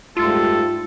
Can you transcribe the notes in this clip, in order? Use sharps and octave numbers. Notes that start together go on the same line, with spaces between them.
G#2 G3 A3 F4 A4